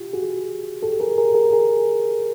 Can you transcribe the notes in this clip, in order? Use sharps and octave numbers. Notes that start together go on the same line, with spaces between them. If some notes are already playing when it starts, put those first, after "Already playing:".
Already playing: F4 G4
F#4 G#4
G4 A4
G#4 A#4
G#4 A#4
G#4 A#4
G#4 A#4